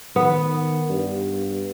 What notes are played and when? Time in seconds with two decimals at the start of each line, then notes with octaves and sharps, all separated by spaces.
0.16 D#3 B3
0.90 G2